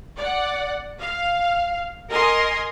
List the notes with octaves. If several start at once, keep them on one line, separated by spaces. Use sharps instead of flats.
D5 F#5
F5
A#4 D#5 G#5 C6